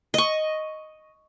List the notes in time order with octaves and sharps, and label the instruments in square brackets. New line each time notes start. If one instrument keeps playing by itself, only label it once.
[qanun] D#5 C#6